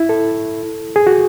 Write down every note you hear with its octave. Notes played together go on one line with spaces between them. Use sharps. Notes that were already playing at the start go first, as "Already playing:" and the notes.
Already playing: E4
A4
G#4
F#4